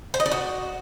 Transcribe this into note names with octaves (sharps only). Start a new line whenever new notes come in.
C5
D#5
D5
F#4